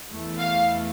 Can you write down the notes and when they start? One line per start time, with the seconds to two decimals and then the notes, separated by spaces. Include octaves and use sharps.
0.10 E2 E3 A3
0.38 F5